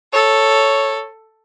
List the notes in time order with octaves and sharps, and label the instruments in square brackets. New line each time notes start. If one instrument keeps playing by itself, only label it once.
[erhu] A4 [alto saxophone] C#5